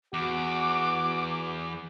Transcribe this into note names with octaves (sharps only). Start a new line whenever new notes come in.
E2 F#4 D6